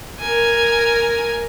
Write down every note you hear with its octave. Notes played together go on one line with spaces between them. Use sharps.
A#4 G#5